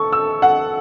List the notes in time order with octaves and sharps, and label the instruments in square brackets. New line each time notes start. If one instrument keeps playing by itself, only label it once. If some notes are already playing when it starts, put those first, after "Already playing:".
Already playing: [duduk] A4 [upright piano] C#6
[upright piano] E6
F#5